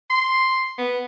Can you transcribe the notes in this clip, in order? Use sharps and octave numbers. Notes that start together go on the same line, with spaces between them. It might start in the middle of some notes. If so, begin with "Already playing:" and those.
C6
B3